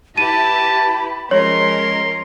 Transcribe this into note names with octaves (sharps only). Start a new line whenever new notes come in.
E4 G4 B4 A5 B5 D#7
F3 G#3 C#4 A#4 C#5 C6